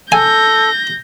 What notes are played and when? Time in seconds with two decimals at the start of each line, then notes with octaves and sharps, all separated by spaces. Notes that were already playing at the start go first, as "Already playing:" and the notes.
0.12 A4 G#5 G6 A#6